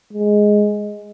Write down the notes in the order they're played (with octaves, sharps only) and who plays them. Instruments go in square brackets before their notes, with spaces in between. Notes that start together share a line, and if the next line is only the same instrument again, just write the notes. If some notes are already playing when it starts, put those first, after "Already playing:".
[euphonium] G#3